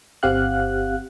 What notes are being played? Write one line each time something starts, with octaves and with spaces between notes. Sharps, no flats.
G1 C4 G4 F5 F#5 F#6